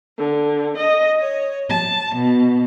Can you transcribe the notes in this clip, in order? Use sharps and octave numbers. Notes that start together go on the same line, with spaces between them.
D3
D#5
C#5
A5
B2